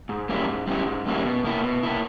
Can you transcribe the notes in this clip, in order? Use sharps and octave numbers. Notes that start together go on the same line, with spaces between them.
G#2
G3 A#3 C#4 E4
G#2
G3 A#3 C#4 E4
G#2
G3 A#3 C#4 E4
B2
A#3 E4
B2
A#3 E4